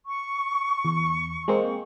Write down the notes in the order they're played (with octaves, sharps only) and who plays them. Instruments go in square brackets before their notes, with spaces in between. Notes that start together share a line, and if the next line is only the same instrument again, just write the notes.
[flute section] C#6
[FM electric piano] E2
G#3 A#3 C4